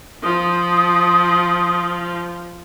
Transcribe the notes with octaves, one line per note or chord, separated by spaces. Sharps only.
F3 D#6